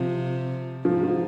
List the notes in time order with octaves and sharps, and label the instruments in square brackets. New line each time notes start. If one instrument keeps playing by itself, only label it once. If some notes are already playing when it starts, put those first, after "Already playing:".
Already playing: [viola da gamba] C3 [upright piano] F3
[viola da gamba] G#2 [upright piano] F3
[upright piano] F3